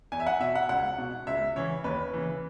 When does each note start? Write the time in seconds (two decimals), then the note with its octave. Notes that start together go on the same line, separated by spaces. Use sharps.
0.12 E2 G#5
0.20 E5
0.27 F#5
0.40 B2 E5
0.56 F#5
0.69 C#2 F#5
0.98 B2
1.27 C#2 E5
1.56 C#3 E3 C#5
1.84 D#2 B4
2.13 C#3 E3